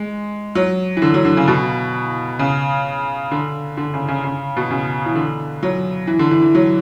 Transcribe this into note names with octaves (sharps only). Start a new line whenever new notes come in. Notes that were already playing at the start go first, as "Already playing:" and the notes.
Already playing: G#3
F#3
E3
D3
F#3
D3
C#3
B2
C#3
D3
D3
C#3
C#3
C#3
B2
C#3
E3
D3
F#3
E3
D3
E3
E3
F#3